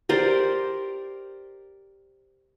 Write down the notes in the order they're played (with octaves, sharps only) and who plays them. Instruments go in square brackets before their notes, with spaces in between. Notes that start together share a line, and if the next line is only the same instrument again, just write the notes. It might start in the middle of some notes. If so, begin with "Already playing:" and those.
[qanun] G4 A#4 C5 D5